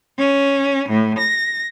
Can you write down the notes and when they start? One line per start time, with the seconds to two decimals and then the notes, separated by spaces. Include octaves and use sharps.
0.18 C#4
0.88 A2
1.18 A#6